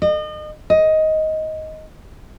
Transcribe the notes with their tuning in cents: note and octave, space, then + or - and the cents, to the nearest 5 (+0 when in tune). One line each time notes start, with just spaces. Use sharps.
D#5 -35
D#5 +10